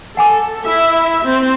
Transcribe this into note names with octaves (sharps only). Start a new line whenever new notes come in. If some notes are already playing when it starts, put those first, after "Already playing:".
A4 F#5 G#5 D6
E4 E5
C4